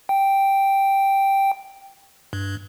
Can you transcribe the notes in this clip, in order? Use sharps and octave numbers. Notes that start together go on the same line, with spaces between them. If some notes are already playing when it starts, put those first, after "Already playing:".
G5
G2